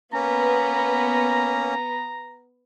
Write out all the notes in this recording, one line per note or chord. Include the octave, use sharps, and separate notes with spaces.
A#3 B3 C#4 A#5